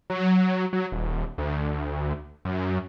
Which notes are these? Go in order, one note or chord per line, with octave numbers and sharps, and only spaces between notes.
F#3
F#3
D#1
D2
F#2